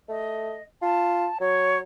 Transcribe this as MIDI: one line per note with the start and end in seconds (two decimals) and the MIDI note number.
0.09 0.57 57
0.09 0.63 75
0.82 1.28 65
0.82 1.38 81
1.40 1.83 54
1.40 1.78 73